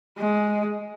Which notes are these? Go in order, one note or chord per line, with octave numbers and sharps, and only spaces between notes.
G#3